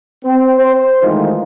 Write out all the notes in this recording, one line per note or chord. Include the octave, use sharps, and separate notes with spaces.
C4
C5
D#3 E3 G#3 A3 D#4 F4